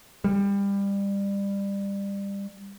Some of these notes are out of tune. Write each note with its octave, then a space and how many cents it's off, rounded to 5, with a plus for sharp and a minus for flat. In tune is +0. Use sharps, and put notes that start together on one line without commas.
G3 +25